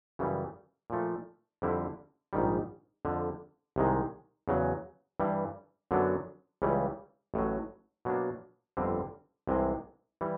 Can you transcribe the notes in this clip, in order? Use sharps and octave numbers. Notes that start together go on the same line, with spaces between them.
F#2 C#3 E3 G3
A#2 F3 A3
F2 D3 G3 C4 E4
A#1 G#2 D#3 G3
F2 D3 F3
C2 C3 D#3 G#3
E2 C#3 F#3
G2 E3 G3
F#2 D3 F#3 B3 D4
C#2 C#3 E3 G3
A1 A2 F#3
B2 F#3 A#3 D4
G1 F2 D3 G3 C4
C2 C3 E3 G#3 C4
E3 G3